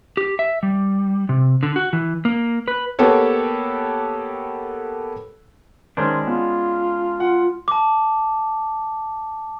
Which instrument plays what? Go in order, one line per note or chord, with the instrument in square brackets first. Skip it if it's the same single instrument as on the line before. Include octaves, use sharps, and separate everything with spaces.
[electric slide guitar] G4
E5
G3
C3
D3
F#4
E3
A#3
B4
[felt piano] A#3 B3 G4 A4 C#5
[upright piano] D#3 A#4 C5 [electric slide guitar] G#3 C#4 D4
[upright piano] B3 [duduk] F4
[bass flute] F4 [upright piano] F#5
[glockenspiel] A5 D6